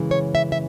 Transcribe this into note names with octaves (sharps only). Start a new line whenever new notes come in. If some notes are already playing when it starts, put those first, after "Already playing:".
Already playing: F#2 C#3 E3 G#3
C#5
E5
E5